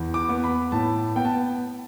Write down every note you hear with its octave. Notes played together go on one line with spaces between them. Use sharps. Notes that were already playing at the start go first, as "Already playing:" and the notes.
Already playing: E2
D6
B3
B5
A2 A5
B3 G5
A5